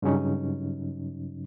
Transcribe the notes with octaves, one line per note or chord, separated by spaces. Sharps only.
G2 C#3 F#3 C#4 D#4